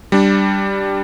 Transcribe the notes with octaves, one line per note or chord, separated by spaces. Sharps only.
G3 D4